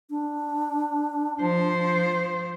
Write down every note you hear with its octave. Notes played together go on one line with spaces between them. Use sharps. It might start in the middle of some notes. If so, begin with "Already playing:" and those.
D4
F3 C5